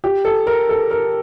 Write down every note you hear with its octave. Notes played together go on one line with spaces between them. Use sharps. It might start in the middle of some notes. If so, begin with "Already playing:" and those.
G4
A4
A#4
A4
A#4